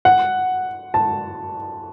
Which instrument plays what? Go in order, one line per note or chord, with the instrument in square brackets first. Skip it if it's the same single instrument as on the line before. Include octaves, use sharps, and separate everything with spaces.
[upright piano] F#5
A5